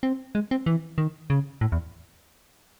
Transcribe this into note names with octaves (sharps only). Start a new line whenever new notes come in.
C4
G#3
C4
E3
D#3
C#3
A2
E2